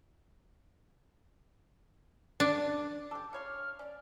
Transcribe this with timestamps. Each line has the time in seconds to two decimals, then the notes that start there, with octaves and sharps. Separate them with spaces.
2.40 D4
3.11 G4 A4 D6
3.33 C#3 C#5 C6 F6
3.79 C#4 D5